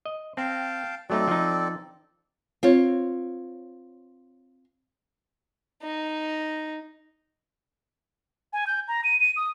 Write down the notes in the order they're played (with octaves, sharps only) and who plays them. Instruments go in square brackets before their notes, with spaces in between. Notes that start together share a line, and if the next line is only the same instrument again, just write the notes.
[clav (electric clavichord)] D#5
[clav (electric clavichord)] C4 [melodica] F5 G5 A5
[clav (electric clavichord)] F#3 A3 D#4 [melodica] C4 A4 D5
[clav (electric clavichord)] F3 D#4
[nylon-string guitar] C4 F4 C#5
[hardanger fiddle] D#4
[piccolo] G#5
G6
A#5
D#7
D#7
D#6